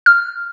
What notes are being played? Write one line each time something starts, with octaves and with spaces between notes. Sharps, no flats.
F6